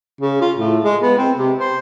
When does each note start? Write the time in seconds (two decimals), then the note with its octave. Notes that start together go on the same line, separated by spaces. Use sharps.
0.21 C#3
0.41 F4
0.57 A2
0.84 G#3
1.02 B3
1.18 C4
1.37 C3
1.59 C5